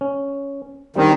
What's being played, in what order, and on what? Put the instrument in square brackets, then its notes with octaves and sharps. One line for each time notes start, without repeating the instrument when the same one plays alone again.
[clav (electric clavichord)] C#4
[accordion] D#3 [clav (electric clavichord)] G3 C4 D4